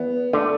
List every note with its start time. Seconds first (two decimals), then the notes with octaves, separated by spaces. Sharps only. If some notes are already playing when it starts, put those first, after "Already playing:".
Already playing: E2 B3
0.33 D3 A3